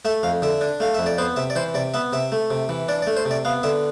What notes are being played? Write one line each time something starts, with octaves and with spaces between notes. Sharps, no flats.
A3 E5
F2 F5
D3 E5
D4
A3 F5
F2 E5
D5
B3 C5
C3 E5
D5
E3 C5
C3 D5
B3 E5
C3 E5
A3
C3
E3
D4 D5
D5
A3
C5
C3
D5
B3 F5
D3 E5